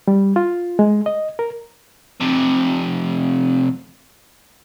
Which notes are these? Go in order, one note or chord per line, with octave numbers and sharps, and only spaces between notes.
G3
F4
G#3
D#5
A#4
F2 C3